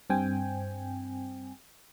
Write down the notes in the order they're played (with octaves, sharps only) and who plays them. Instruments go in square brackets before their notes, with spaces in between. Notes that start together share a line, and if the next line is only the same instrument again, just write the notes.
[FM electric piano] G2 C4 G5 G#5